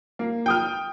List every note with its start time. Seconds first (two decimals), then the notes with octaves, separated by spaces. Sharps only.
0.19 A#3
0.46 G5 D#6 F6